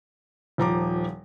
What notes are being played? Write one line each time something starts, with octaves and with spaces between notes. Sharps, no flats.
D#1 F3 A#5 D6